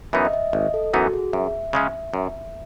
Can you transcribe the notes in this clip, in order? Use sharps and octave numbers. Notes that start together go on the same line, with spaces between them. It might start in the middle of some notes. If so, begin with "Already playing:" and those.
F#2 E3 B3 D#4 E5
D#5
E5
G#1 D#5
A4
F#2 E3 B3 D#4 F#4
G#4
F#2 E5
C#3 G#3 C#4
F#2